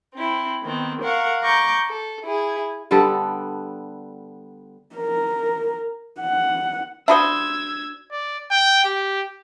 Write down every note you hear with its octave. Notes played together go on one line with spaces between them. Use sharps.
C4 E4
D#3 B3 C4
A#4 F5 F#5 C#6
A#5 C#6 D6 G6
A4
E4 G#4
D3 G3 B3 A4
A#4
F#5
D4 F#4 C5 E5 B5 D#6 E6 G#6
D5
G5
G4